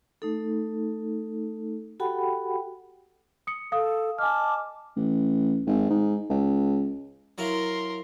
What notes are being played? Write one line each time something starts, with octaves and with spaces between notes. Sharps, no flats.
A3 D#4 A4
F#4 G4 A4 F#5 G5 B5
D#6 C#7
A4 F5 D#6
D#5 G#5 A5 D6 F6
A1
G#1
G#2
C#2
F#3 E4 F4 A#4 C6